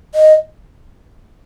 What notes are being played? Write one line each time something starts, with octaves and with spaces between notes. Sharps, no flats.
D#5